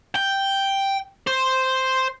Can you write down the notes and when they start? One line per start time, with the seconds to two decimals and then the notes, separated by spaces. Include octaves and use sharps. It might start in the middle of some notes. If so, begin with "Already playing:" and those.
0.16 G5
1.27 C5